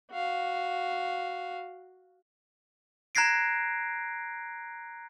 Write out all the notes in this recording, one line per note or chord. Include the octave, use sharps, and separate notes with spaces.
F#4 F5
A#5 F#6 G#6 A#6 C7 D7